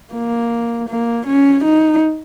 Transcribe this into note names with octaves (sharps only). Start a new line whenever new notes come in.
A#3
A#3
C#4
D#4